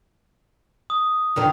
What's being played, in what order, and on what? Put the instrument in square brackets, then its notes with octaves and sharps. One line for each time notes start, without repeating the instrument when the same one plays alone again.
[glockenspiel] D#6
[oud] F2 D3 D#3